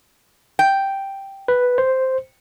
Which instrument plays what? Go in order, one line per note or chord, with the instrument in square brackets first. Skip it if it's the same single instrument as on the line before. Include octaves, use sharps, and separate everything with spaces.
[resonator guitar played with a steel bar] G5
[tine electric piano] B4
C5